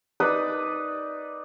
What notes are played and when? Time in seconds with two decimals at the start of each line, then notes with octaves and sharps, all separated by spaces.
0.20 D#4 B4 D5 D#6